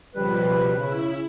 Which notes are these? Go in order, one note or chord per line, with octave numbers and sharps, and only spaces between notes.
C#2 B2 F3 G3 B4
C#3 E4